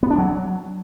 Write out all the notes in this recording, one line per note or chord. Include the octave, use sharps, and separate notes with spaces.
B3
D4
F#3